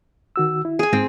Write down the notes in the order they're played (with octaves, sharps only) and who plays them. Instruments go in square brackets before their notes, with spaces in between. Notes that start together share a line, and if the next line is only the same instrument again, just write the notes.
[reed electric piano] D#3 F#4 E6
E4
[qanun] G#4 G#5
[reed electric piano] G#2 [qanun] C4